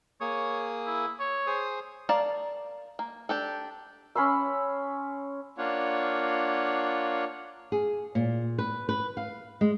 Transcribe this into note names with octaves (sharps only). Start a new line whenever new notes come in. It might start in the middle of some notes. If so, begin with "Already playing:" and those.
A#3 G#4 C#5 D#6
E4
C#5
G#4 C5 D#6
A#4 D5 F5 A5
A#3
D4 G4 A4
C#4 B5 C6 E6
A#3 D4 F4 C#5 F#5
G#4
A#2
B4
B4
F5
G#3